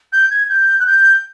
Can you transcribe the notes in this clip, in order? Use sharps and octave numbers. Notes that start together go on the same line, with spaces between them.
G6
G#6
G6
F#6
G6